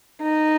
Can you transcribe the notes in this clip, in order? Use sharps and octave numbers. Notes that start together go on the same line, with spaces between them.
D#4